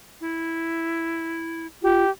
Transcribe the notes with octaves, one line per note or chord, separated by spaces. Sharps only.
E4
F4 G4